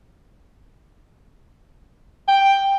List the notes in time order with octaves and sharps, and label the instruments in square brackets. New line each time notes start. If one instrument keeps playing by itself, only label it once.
[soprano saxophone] G5